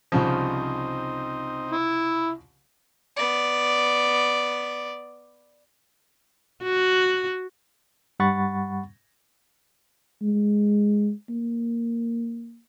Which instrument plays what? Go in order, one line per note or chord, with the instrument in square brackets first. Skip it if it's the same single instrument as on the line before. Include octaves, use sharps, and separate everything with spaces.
[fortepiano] C2 C#3 F3 [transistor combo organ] C4 D#4
[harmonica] E4
[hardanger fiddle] B3 D5
[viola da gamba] F#4
[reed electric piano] G2 G3 F#5 B5 C#6 A6
[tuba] G#3
A#3